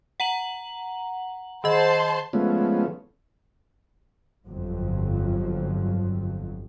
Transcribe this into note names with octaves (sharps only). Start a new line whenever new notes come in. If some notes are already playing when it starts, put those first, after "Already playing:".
F#5 A#5 F#7
D#3 C5 D#5 A5 C6
F3 G#3 A3 B3 C#4
G1 F2 F3 F#3